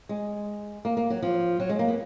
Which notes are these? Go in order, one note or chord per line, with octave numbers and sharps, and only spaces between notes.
G#3
A#3
A#3
F#3
F3
F#3
G#3
A#3
B3